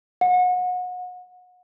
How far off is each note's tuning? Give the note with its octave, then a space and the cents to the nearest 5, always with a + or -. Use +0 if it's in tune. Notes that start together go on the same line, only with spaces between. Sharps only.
F#5 -30